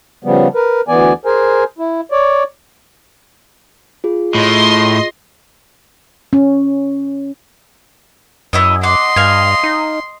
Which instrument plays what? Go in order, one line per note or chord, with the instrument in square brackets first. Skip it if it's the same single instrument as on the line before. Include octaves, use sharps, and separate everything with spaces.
[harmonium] C#3 F3 G3 B3
A#4 B4
D2 E3 B3 D5 G#5
G#4 A#4 C5 G#5
E4
C#5 D5
[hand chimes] F4 G#4
[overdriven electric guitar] A2 [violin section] D#5 C6
[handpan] C#4
[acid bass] F#2 [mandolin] E4 C#5 D#5
[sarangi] D#5 [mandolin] F#5 D6 [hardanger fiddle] C6
[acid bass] G2 [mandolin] F5 G#5
[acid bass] D#4